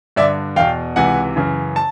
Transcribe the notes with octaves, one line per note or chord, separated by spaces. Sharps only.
G2 D3 D5 E5
E2 B2 F5 G5
C#2 C3 E3 F#5 G#5
F#2 C#3 E3
A5